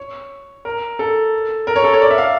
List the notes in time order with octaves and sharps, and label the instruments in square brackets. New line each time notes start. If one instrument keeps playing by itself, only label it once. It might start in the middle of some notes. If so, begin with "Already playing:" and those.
Already playing: [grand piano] C#5
A#4
A4
A#4
C#5
A4
C#5
D5
E5
F5